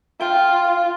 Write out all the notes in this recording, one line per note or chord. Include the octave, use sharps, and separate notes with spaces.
F4 G5